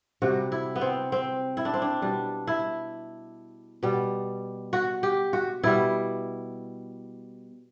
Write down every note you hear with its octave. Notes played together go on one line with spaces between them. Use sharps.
C3 G3 F#4
E4
B3
C4
C4
E4
D4
C4
D4
B2 G3 D4
E4
B2 G3
F#4
G4
F#4
B2 G3 E4